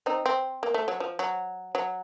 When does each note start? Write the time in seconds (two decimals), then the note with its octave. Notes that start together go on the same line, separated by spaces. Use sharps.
0.06 C4 D#4
0.26 C4
0.63 A#3
0.74 A3
0.88 F#3
1.00 F3
1.19 F#3
1.75 F#3